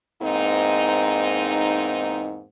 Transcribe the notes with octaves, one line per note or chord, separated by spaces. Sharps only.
E2 G#2 A#3 C4 D#4